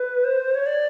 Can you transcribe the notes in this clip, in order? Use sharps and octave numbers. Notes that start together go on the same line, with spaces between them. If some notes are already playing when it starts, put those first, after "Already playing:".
Already playing: B4
C5
C#5
D5